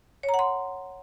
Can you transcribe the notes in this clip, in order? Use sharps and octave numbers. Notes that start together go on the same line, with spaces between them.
C#5
A#5
F#5
C6